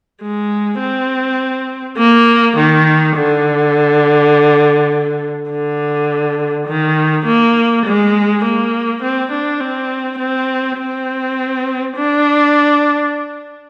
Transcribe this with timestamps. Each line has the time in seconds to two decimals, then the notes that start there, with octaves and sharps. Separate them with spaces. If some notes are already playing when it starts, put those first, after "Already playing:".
0.22 G#3
0.80 C4
1.98 A#3
2.57 D#3
3.16 D3
5.51 D3
6.68 D#3
7.26 A#3
7.86 G#3
8.44 A#3
9.03 C4
9.32 D4
9.61 C4
10.19 C4
10.79 C4
11.96 D4